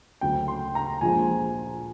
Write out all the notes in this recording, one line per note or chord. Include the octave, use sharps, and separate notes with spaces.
D2 C#3 F#3 G5
C6
A#5
A#1 A#2 F3 G#3 G#5